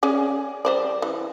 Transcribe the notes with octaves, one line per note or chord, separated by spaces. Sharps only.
C#4 G#4 D5
G3 C5 D5
E3